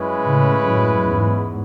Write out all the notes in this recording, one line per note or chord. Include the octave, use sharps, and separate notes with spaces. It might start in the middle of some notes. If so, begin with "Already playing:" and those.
Already playing: F#2 G#3 C#4 E4 B4
A2 C#3
F#2 A2
E2 G#2